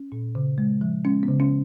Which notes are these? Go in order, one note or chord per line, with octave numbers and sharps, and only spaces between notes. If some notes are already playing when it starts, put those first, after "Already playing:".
Already playing: C#4
A#2
C#3
G#3
F3
G#3 C#4
C#3 B3
C#4